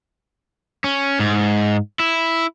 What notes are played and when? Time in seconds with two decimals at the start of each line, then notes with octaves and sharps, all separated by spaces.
0.84 C#4
1.19 G#2
1.99 E4